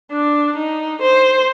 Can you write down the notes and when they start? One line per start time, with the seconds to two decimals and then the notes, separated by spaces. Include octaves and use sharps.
0.13 D4
0.57 D#4
1.02 C5